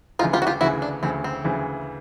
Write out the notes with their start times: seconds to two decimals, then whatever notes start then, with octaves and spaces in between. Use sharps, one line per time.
0.19 D2 D#4 F4
0.22 C#3 E3
0.33 F4 G4
0.42 F#4
0.47 F4 G4
0.61 D2 C#3 E3 E4 F#4
0.82 D4
1.03 D2 C#3 E3 C4
1.24 C4
1.44 D2 C#3 E3